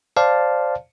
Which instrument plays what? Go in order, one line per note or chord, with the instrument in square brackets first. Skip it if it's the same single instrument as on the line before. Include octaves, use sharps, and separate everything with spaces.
[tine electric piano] C5 D5 F5 A5